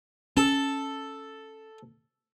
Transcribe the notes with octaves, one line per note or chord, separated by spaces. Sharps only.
C#4 A4 A5